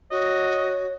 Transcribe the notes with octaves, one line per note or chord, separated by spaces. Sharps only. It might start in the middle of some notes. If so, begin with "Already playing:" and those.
F#4 C#5 D#5